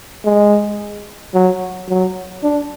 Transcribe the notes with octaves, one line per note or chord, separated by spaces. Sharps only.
G#3
F#3
F#3
D4